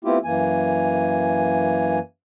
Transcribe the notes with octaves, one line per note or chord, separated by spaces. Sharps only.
A3 B3 C4 E4 F4 G4
F#2 E3 A#3 G#5